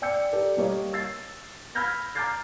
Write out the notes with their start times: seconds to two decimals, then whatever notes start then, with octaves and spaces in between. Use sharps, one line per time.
0.02 D5 G5 E6 G6 C#7
0.32 G4 A4 A#4 D5
0.57 G3 A#3 G4 C#5 D#5
0.93 E6 A6 C7
1.75 B5 E6 F6 G6 G#6 A#6
2.15 A#5 D6 F6 G6 A6 C7